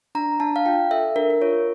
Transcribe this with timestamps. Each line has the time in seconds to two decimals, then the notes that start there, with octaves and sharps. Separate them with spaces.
0.15 D4 A#5
0.40 D4 A5
0.56 F5
0.66 F4 G5
0.91 A4 E5
1.16 D4 A#4
1.30 A#4
1.42 F4 C#5